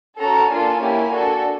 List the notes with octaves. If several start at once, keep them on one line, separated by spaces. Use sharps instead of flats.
C#4 F#4 A4 A#5
A#3 D4 F4 A4 G#5
A#3 C#4 E4 G4
D4 F#4 A4